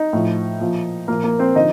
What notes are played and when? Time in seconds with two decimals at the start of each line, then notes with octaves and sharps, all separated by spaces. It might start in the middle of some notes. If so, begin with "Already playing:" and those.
Already playing: D#4
0.13 A2 F3
0.60 A#2 F3
1.08 A#2 F3 A#3 A#4
1.24 A#3 A#4
1.39 C4 C5
1.55 D3 F3 D#4 D#5